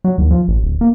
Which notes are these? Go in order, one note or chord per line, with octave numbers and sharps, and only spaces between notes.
F#3
D#2
F3
A1
D1
A#3